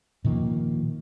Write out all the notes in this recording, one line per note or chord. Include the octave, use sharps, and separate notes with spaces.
A#2 D#3 F3 A#3